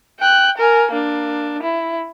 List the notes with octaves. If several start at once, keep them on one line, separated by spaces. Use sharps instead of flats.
G5 F#6
A#4 G#5
A#3 D4
E4